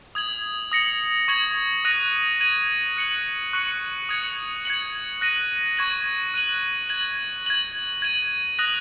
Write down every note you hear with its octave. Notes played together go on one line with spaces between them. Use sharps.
D#6 G#6 F#7
D#6 A#6 C#7 F#7
C#6 G#6 F#7
D#6 F#6 A#6 D#7
G#6 D#7 F#7
F#6 C#7 F#7
C#6 F#6 C#7 F#7
D#6 G#6 C#7 F#7
G#6 C#7 F#7
F#6 A#6 D#7 F#7
C#6 G#6 F#7
F#6 D#7 F#7
G#6 F#7
G#6 F#7
G#6 D#7 F#7
D#6 F#6 A#6 F#7